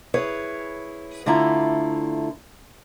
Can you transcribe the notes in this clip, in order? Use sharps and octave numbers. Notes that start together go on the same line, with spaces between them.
E4 G#4 B4 C#5
D2 D3 A3 E4 F4 A#5